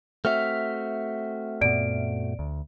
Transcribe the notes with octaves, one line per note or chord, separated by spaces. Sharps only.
A3 C4 F#4 E5 F6
F#2 A#2 B3 D5 D7
D2